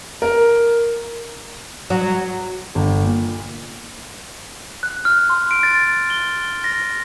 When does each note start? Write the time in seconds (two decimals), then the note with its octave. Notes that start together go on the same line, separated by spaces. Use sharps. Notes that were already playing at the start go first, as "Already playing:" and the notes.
0.22 A#4
1.90 F#3
2.75 G1
3.03 A#2
4.83 F#6
5.05 F6
5.30 C6
5.51 D7
5.63 A6
6.10 G7
6.64 A#6